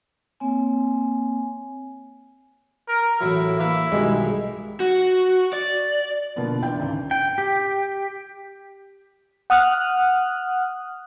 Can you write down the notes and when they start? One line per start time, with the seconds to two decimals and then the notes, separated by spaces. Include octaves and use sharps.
0.40 A#3 C4 C#5 G#5
2.89 A#4
3.21 A1 A2 F#3 E4
3.59 E3 A#3 E4 B4
3.92 B1 G2 D#3 G#3
4.80 F#4
5.53 D5
6.36 B2 D3 F3 A#3 B3
6.62 D3 E3 D4 G5 G6
6.80 G#1 C#2
7.11 G5
7.38 G4
9.50 F#5 D#6 F6 F#6